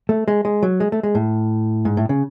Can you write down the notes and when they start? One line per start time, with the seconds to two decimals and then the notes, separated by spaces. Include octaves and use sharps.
0.09 A3
0.28 G#3
0.45 G#3
0.63 F#3
0.80 G#3
0.92 A3
1.03 G#3
1.15 A2
1.85 G#2
1.97 A2
2.09 C#3